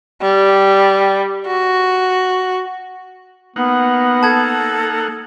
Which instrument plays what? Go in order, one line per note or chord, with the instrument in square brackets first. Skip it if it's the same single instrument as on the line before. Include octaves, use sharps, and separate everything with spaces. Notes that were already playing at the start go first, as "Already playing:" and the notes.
[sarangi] G3
F#4
[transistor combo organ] A#3 D#4 F#5 [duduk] B3
[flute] A4 [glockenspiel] A5 G#6